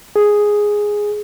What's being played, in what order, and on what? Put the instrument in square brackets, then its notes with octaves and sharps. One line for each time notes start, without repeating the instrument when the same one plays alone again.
[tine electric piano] G#4